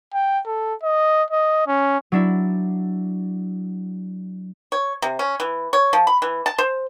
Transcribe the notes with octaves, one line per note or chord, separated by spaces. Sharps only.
G5
A4
D#5
D#5
C#4
F#3 D4 E4
C#5
C3
C#4
E3
C#5
F3
B5
E3
A5
C5